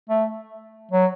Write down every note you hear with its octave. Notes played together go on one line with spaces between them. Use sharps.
A3
F#3